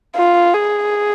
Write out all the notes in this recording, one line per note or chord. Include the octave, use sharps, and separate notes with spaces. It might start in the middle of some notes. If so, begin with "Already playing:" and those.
F4
G#4